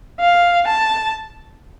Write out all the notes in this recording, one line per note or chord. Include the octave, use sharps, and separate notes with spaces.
F5
A5